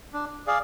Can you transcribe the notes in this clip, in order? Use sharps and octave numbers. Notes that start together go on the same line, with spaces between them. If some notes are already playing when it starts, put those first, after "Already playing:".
D4
G#4 D5 F5